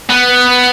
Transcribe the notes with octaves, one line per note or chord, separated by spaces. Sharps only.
B3